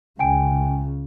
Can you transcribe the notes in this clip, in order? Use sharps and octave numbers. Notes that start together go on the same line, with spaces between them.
C#2 C#3 G5 G#5 D7